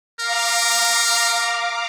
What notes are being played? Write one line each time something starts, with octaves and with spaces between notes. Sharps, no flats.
A#4 F5 A#5 D6